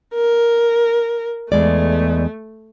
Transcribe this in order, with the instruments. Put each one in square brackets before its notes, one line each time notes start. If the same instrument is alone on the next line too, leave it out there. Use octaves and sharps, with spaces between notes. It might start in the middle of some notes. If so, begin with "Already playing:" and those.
[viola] A#4
[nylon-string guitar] E2 G#3 D5 [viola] A3